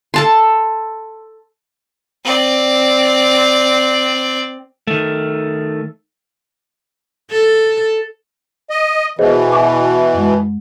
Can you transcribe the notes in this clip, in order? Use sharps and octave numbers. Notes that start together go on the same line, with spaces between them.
A4 A5 C6
C4 D5
D#3 A3
A4
D#5
B2 E3 G#4 C5 D#5
G#5 C#6 D6
F#2 G#3